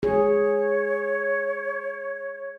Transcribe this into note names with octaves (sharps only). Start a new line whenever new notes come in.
G#4 C#5